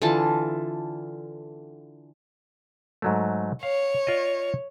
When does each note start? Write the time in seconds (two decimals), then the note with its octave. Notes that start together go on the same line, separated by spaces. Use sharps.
0.02 D3 E3 F4 A5
3.02 G#2 F#3 A3
3.63 C#5 F5
4.07 F4 D5 D#5